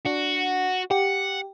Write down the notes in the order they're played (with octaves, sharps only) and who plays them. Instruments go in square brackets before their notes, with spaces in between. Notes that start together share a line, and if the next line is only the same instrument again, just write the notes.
[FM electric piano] D4 [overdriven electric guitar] F#4
[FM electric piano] G4 [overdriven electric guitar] F#5